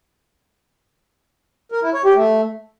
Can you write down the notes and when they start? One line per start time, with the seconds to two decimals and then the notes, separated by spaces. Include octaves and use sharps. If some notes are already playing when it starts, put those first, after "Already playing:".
1.72 A#4
1.83 E4
1.94 C#5
2.05 G4
2.16 A3